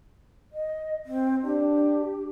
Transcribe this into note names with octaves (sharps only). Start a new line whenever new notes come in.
D#5
C4
D4 G4